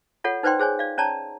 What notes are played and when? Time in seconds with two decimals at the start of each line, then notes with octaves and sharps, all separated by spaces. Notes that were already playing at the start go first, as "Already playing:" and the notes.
0.24 F4 A4 C#5 F#5
0.43 D#4 B4 C5 D5 G5 C6
0.59 G#4 C5 C#5 G#5
0.79 D5 F5
0.98 C#4 C#5 D5 A5 A#5